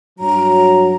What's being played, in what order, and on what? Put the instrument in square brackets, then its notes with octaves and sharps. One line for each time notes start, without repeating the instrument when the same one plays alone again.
[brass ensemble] G2 F#3 [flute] A#5